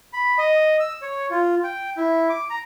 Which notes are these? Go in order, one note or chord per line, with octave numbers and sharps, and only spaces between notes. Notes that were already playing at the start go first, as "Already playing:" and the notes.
B5
D#5
E6
C#5
F4
G5
E4
D6
A#5